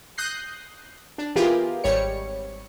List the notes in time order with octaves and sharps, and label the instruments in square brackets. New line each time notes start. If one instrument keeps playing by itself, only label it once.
[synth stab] D#6 F#6 G6 A#6 C7
D4
E3 B3 F4 G4 G#4 A#4
G#1 G3 C#5 C#7